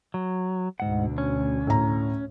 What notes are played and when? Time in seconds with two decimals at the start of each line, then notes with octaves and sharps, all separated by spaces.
0.14 F#3
0.80 D2 G#2 B2 D3 F#5
1.18 C#4
1.67 A2 A#5